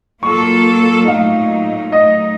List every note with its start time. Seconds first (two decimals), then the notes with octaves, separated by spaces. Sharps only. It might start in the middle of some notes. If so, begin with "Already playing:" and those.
0.23 F#3 A#3 F4 A4 C#6
1.08 A#2 F#3 A3 D#4 F5
1.92 F#3 A3 D#4 D#5